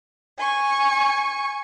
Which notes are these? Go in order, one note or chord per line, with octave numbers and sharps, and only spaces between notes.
G#5 C#6